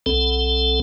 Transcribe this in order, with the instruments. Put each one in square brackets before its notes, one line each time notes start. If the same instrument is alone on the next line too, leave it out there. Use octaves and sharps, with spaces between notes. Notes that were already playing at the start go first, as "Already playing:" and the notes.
[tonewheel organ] B1 C4 A4